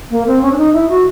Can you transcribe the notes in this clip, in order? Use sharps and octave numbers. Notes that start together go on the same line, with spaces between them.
A#3
C4
C#4
D4
D#4
E4
F#4